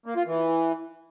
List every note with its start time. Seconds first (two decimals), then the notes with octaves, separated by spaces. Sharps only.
0.06 A#3
0.16 F4
0.26 E3